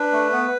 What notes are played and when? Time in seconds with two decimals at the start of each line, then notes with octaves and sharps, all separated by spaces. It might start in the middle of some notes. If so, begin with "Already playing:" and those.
Already playing: D4 B4
0.12 A3
0.32 B3